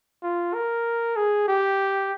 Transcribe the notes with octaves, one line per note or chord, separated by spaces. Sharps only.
F4
A#4
G#4
G4